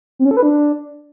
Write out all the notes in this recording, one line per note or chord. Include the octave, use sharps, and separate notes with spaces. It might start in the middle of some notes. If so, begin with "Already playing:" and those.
C4
C#4
A4
B4
D4